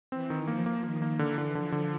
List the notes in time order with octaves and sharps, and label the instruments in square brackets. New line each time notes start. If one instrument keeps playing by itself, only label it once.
[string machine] E3 [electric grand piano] C4
[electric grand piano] D#3
[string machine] F3 [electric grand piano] A#3
[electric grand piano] A#3
[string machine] D#3 [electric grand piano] A#3
[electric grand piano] A#3
[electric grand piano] D3 [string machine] E3
[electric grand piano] D3
[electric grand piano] D3 [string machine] F3
[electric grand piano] D3